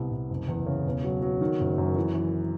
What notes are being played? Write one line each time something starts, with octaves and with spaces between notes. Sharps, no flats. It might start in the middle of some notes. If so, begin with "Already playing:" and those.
Already playing: C2 B3
C2
F#1
E2
C#3
E1
F#3
F#3
D#3
F#1
F#2
E3
E3